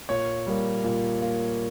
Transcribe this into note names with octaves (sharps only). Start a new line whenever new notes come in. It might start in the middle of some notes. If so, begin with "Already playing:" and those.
A#2 C#5
G3 A#3
A#2
A#3